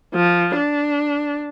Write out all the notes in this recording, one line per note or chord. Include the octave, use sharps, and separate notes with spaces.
F3
D4